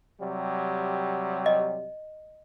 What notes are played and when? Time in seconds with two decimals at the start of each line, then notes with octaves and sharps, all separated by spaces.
0.20 C3 F#3 G3
1.46 D#5